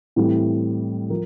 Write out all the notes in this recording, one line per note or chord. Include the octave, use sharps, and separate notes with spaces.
A2 E3 G3 C4
F3 A#4